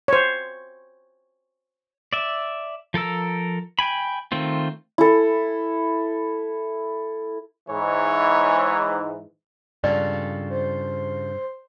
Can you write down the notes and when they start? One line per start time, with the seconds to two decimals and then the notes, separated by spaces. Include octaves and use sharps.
0.08 C5 C#5
2.13 D5 E5
2.94 F3 A4 A#4 E6
3.79 G5 G#5 B5
4.32 D#3 A3 C4 F4
4.98 E4 A4
7.69 G#2 E3 C#5
9.84 G2 C#3 F4 A4 D5
10.50 C5